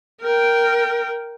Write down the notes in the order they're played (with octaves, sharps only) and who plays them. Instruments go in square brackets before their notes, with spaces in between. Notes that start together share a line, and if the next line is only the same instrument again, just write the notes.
[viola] A#4 G5